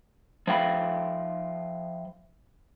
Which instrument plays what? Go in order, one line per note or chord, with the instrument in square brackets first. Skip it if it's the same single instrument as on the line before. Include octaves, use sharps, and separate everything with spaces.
[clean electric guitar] F3 E5 F5 G5 A#5 B5